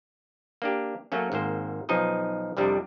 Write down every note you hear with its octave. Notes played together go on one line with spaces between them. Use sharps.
A#3 D4 G4
F#3 A3 A#3 C#4
G#1 G#2 A#3 C5
B1 F3 C#4 D#4 D#5
C2 F2 C3 G3 D4